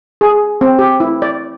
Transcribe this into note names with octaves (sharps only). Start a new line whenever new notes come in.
G#4
C4
G4
E4
D5